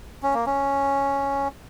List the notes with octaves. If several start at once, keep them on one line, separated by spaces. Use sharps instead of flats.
C#4
A#3
C#4